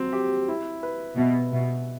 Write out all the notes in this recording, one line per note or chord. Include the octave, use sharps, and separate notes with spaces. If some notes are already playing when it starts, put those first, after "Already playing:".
Already playing: F#3 C4
G4
E4
B4
B2 E5
B2 E5